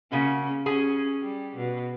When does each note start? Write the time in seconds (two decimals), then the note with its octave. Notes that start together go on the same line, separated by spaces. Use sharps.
0.12 C#3 A#3 C#4 F#4
0.66 C#4 G#4 G#5
1.22 G3
1.56 B2